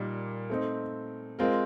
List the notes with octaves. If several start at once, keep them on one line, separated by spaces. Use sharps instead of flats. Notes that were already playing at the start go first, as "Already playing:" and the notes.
Already playing: A#2 G3 A#3 D#4 G4
A3 C4 D#4
G#3 C4 F4 A#4